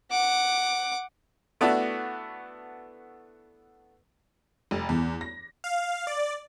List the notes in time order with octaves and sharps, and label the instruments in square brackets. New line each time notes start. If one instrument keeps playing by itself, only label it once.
[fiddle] F#5 D6
[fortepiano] A3 B3 D4 E4 F#4
[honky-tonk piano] F1
E2
A#6
[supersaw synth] F5
D5